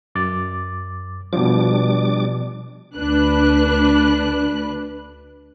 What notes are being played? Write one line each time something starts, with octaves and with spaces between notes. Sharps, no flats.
F#2 D6 A6
B2 F3 G3 D4 D6
D2 D4 B4 F#6